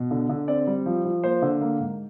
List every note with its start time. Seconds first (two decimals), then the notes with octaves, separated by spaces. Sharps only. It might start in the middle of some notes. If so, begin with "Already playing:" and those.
Already playing: B2
0.11 D3
0.29 D3
0.48 C4 D5
0.67 G3
0.86 F3
1.05 F3
1.23 A#3 C5
1.42 D3
1.61 A#3
1.80 G#2